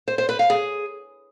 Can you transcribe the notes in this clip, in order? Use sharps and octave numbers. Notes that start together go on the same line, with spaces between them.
C5
C5
B4
F5
G#4